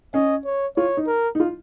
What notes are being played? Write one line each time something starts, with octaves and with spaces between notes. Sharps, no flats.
C#4 D#5
C#5
F4 C#5
D#4
A#4
D#4
F4